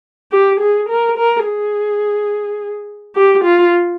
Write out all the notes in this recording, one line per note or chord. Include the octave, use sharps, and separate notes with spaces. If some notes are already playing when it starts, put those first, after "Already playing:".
G4
G#4
A#4
A#4
G#4
G4
F4